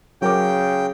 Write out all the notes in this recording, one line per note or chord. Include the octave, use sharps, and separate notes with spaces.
C#3 F#3 A#4 G5 D6